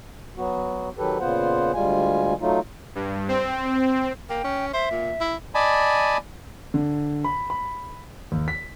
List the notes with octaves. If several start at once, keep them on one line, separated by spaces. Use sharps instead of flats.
F#3 B3 F#4
D#3 F#3 G4 A4 B4
A#2 C#3 B3 F4 C5 F#5
D2 G3 G#3 F4 G#5
F#3 A3 D#4 F4
G2
C4
A#3 G5
C#4
C5 E5
A#2
E4
D5 D#5 G#5 A5 B5
D3
B5
B5
D#2
B6